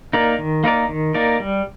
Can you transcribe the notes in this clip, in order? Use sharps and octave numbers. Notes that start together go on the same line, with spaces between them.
A#3 D#4 A#4 D5
D#3
A#3 D#4 A#4 D5
D#3
A#3 D#4 A#4 D5
G3